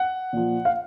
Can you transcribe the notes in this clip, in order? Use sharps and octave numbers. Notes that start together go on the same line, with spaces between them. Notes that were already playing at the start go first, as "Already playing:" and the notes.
Already playing: F#5
A#2 F3
F5